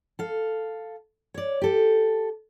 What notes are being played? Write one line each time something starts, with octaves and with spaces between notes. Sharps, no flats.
A4 F5
C#5 D5
G4 A4